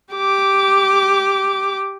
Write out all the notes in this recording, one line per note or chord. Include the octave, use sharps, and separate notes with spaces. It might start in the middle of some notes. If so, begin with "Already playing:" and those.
G4 D6